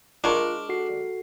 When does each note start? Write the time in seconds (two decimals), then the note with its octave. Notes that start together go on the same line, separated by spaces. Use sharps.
0.24 G#3 D4 F4 A#4 C#6
0.69 F#4 A4 C7